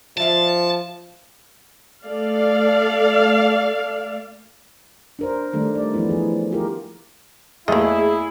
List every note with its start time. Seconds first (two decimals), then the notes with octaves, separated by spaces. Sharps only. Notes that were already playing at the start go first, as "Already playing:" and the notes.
0.17 F3 D5 E5 F5 A5
2.04 A3 A4 D5 F5
5.19 D4 A#4 C5
5.53 D#3 G3 A3 D4
5.75 D5
5.94 E3 F3 A3 B3 E4
6.09 E3 G#4
6.52 F4 G4 G#4 A#4
7.68 E2 A3 A#3 E4 G#4 D#5